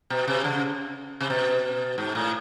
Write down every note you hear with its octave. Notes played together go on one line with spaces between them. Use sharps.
B2
C3
C#3
C3
B2
G#2
A2